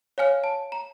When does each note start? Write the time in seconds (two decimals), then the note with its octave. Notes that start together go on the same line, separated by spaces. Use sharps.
0.18 C#5 F5 G#5 F6
0.44 A5
0.72 A#5